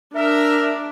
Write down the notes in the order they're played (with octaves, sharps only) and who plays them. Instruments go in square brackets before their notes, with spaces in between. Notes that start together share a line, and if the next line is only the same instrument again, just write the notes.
[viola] D4 [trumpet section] A#4 [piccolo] E5